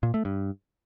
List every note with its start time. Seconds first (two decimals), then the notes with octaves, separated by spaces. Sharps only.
0.03 A#2
0.14 A3
0.25 G2